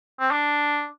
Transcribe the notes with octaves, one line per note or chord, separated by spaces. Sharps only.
C4
D4